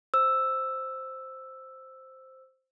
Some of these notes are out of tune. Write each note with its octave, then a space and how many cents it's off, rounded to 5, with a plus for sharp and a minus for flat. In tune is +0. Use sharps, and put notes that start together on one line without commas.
C5 +0 E6 +0